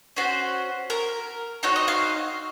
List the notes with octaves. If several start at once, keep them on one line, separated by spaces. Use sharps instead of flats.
C#4 F#4 C5
A#4
C4 D#4 F#4 C#5
D#5
F5